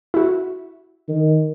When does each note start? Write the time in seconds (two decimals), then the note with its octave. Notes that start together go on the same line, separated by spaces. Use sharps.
0.14 E4 F#4
1.09 D#3